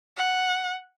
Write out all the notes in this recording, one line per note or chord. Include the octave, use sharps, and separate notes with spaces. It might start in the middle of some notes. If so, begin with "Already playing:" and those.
F#5